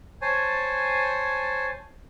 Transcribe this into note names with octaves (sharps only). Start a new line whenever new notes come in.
C5 C#5 G#5 A5